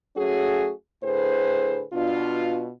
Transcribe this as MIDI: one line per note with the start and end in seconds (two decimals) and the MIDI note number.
0.16 0.72 54
0.16 0.72 57
0.16 0.72 61
0.16 0.72 66
0.16 0.72 68
1.03 1.83 45
1.03 1.83 50
1.03 1.83 68
1.03 1.83 71
1.03 1.83 72
1.93 2.70 47
1.93 2.70 62
1.93 2.70 65